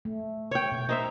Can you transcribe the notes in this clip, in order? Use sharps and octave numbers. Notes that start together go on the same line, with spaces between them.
A3
C#5 G5
B2
D#4 C5 E5